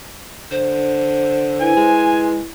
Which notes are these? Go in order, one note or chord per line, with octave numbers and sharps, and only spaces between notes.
D3 C5
E4 B4 G#5
G#3